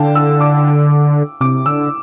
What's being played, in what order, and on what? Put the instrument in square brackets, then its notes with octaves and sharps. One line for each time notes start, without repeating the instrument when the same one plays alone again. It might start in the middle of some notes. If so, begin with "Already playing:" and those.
Already playing: [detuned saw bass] D3 [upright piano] F5 G5 A5
[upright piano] E6
D6
[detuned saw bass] C3 [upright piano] D6
[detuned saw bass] D3 [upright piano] E6